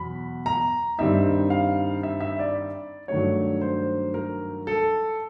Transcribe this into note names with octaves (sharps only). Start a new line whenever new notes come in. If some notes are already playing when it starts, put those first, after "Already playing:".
Already playing: E2 B2 F#3 B5
A#5
G2 D#3 G3 C4 D#4 E5
F5
E5
E5
D5
G2 D#3 F#3 A3 D4 C#5
C5
A#4
A4